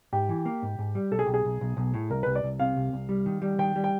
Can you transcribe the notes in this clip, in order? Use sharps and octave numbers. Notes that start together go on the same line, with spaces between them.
G#2 G4
E3
A#3
G#2
G#2
G3
B1 A4
G#4
B1 G4
G#4
B1
B1
B1
A2
C2 A#4
C2 B4
D5
C2
C3 F5
C2
C2
G3
D#3
G3
D#3 G5
G3
G5